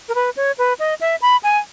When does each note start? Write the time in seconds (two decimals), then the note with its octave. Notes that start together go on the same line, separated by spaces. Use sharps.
0.09 A#4
0.15 B4
0.37 C#5
0.58 B4
0.79 D#5
1.01 E5
1.22 B5
1.43 G#5